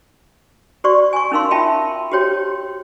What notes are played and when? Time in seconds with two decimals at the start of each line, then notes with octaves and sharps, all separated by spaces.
0.84 F#4 C5 D5 C#6
1.13 G#5 C#6
1.31 C#4 D#4 A#4 F5 C6
1.51 F4 E5 G5 A5 B5
2.12 F#4 G4 C5 C#5 G5